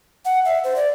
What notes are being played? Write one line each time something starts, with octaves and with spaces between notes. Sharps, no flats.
F#5
E5
C5
D5